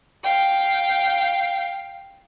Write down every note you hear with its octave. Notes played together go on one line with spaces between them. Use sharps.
F5 G5